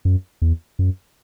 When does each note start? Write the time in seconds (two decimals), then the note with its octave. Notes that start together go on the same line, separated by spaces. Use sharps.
0.05 F#2
0.42 E2
0.79 F#2